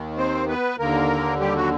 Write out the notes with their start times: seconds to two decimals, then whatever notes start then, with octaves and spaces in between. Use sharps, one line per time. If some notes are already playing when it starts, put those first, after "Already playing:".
Already playing: D#2 D#3
0.17 C4 C5
0.48 B3 B4
0.79 D#2 D3 A#3 A#4
1.40 G3 G4
1.56 F#3 F#4